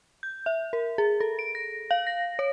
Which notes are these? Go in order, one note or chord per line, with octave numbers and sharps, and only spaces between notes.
G6
E5
A#4
G#4
A4
D7
A#6
F5
A#6
C#5